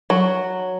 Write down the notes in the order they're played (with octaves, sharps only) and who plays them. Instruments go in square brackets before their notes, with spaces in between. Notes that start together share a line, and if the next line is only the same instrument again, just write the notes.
[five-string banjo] F#3